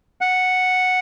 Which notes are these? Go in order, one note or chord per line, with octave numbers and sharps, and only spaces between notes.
F#5